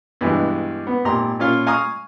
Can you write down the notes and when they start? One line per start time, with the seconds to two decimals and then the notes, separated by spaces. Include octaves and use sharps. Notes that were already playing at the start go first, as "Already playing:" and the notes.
0.21 G2 B2 E3 G#3
0.87 B3
1.04 G#1 A#2 G4 A#5 C6
1.39 A#2 C#4 F4 F5
1.66 F5 G#5 A#5 C#6 D#6 F6